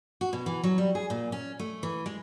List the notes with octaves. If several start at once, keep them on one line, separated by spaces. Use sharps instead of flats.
F#4
B2
E3
F#3
G3
G#4
A#2
C#4
A3
E3
G#3